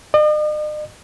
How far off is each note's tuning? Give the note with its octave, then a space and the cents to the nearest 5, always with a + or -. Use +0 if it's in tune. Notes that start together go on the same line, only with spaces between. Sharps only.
D#5 -45